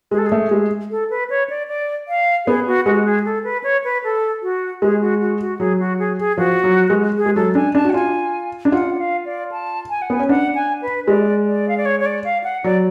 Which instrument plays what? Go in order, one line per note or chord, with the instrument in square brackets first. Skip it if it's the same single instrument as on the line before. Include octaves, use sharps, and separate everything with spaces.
[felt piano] G#3 [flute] G#4
[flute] A4
G#4
[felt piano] A3
G#3
[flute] A4
B4
C#5
D5
D5
F5
[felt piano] B3 [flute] G#4
[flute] F#4
[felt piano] G#3 [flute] F#4
[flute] G#4
A4
B4
C#5
B4
A4
F#4
[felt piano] G#3 [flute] G#4
[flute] F#4
F#4
F#4
[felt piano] F#3 [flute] G#4
[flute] F#4
G#4
G#4
[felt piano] F3 [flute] F#4
[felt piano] F#3
G#3
[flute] G#4
[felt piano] G#3
[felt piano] F#3 [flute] A4
[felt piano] D4 [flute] G#5
[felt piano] D4 [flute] A5
[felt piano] F#4
[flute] F#5
[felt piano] F4 [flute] G#5
[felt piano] D4
[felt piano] F4 [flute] F#5
[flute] D5
F5
D5
A5
G#5
F#5
[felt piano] B3 [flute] G#5
[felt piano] C#4
[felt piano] D4 [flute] F#5
[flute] G#5
B4
[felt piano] G#3 [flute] D5
[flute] D5
F5
D5
C#5
C#5
D5
F5
F#5
[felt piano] F#3 [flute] D5